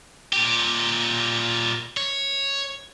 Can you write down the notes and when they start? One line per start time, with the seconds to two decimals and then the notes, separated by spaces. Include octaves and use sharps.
0.33 A#2 G4
1.97 C#5